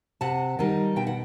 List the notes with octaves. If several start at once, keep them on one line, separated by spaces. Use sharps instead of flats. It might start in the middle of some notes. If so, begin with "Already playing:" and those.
C3 F#5 A5
D#3 G3 D#4
B2 G5
F#5